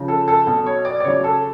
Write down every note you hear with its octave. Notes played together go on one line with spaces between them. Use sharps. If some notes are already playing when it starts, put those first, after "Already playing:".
Already playing: C#3 F3
A4
A4
B2 F#3 A4
C#5
D5
D5
C#3 F#3 C#5
A4